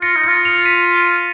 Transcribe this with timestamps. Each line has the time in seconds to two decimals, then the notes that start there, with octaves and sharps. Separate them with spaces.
0.02 F4 A#6 C#7
0.15 D#4
0.24 F4 A#6 C#7
0.45 C#7 F7
0.60 C#7
0.66 B6 D#7